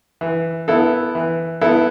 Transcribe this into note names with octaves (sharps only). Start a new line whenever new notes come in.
E3
B3 E4 A4
E3
B3 E4 A4